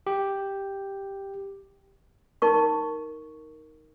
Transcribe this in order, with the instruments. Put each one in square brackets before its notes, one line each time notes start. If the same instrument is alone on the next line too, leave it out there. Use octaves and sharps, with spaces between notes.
[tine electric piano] G4
[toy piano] D#4 A#4 C#6